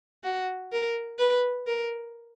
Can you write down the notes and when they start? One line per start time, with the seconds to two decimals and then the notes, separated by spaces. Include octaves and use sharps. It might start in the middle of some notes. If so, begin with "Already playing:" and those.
0.24 F#4
0.72 A#4
1.19 B4
1.67 A#4